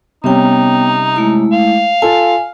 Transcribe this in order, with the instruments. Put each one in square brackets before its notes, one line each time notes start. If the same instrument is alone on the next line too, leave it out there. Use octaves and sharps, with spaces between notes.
[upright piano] C3 G3 C#4 [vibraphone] B3 G5 [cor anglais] D#4
[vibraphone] G#3 A3 E4
[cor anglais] F5
[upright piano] F4 A4 [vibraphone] G#5